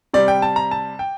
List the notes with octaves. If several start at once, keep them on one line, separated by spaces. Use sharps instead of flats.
C3 G3 D5
G5
A5
A#5
A5
G5